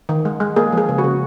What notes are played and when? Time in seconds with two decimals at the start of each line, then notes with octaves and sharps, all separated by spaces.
0.09 D#3
0.25 G#3
0.40 G#3
0.56 A#3 G#4
0.72 F3
0.77 G#4
0.89 C#3
0.98 F#4
1.04 C#3